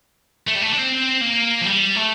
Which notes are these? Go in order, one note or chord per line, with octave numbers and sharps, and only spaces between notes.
A3
G3
A3
D4
C4
A#3
F3
G3
A3